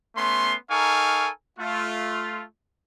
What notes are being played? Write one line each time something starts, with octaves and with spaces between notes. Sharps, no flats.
A3 B3 C#4 C6
D#4 A4 A#4 F5 G#5 C#6
A3 F4